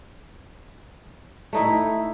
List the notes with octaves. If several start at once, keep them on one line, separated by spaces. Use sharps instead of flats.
A3 D#4 E4